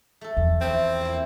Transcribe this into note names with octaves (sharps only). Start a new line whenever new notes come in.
A3 A4
E2
F3 A3 C4 E4
A#3 E4